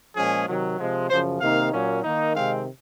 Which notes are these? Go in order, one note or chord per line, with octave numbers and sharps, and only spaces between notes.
A#2 F3 G#3 C#4 G#4
C3 D#3 F#3
C3 F3 G#3
F#2 C#3 F3 C5
C3 D#3 A#3 D#4 F5
A#2 F#3 A#3 C#4
D#3 A#3 D#4
C3 D#3 G#3 C4 F5